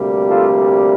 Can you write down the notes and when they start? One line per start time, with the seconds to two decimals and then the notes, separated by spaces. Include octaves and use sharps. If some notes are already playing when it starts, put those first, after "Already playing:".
Already playing: D2 C3 G3 A#3
0.28 F4 A4